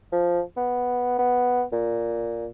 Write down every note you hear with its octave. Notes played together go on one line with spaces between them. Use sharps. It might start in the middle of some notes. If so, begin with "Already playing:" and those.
F3
B3
B3
A#2